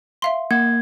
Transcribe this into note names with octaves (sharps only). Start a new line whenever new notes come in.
E5 F5 C6
A#3 F#5 G#6